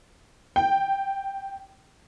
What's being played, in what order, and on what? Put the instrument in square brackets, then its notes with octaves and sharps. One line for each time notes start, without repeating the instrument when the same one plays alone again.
[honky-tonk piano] G5